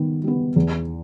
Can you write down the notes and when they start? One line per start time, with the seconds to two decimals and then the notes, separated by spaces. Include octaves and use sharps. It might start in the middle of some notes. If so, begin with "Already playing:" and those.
Already playing: D#3 G3 B3
0.24 G3 B3
0.56 E2